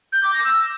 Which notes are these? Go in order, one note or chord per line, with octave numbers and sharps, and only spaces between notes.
G6
D6
A#6
E6